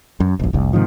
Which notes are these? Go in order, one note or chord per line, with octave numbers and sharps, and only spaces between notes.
F#2
E1 A#1
F1 C2
G#2 C3 D#3 F3